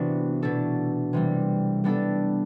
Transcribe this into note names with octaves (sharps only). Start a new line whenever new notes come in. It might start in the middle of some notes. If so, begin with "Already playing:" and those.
Already playing: C3 E3 B3 D4 F#4
B2 A3 D4 A4
C3 E3 G3
G3 B3 D4 A4